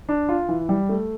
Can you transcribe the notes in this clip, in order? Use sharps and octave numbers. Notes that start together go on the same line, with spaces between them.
D4
F4
E3
G3
A3